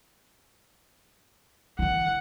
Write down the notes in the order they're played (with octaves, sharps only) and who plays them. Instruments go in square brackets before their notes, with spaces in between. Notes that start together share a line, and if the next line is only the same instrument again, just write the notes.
[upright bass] D3 E3 [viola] F#5